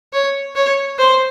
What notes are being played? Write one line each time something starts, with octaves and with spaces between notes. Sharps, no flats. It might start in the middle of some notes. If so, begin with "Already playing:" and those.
C#5
C#5
C5